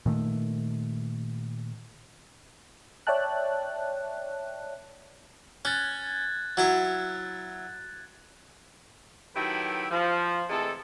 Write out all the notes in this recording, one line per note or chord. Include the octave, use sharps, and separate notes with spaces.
A#2 D#3 A3
C#5 D5 E5 G5 A5 F#6
C#4 F#6 G#6 A6
F#3 E4 C#5
D#3 F#3 E4 G4 A4 B4
F3
C3 E3 G#3 A3 A4